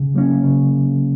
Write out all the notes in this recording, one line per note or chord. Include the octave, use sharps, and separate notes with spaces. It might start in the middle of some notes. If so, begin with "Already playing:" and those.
Already playing: C#3
F#3 A#3 C#4
C#3